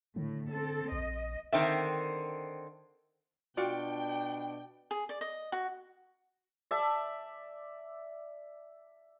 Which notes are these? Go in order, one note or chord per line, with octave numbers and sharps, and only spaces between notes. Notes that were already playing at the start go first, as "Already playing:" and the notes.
A2 D3
C4 A4
A#1 D#5
D3 D#3 C4 E5
B2 D4 F4 F#4 D5 G5
G#4
D5
D#5
F#4
D5 E5 A5